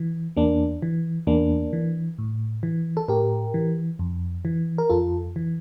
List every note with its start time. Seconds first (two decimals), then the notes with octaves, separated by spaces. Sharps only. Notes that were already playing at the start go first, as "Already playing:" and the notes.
Already playing: E3
0.37 E2 A#3 D4
0.82 E3
1.27 E2 A#3 D4
1.73 E3
2.18 A2
2.63 E3
2.97 A4
3.08 A2 G4 A#4
3.54 E3
3.99 F2
4.45 E3
4.78 A#4
4.90 F2 F4 A4
5.36 E3